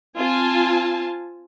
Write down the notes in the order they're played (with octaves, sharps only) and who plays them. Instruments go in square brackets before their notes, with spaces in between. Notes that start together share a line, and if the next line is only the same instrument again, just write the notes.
[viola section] C4 F4 G#5 A5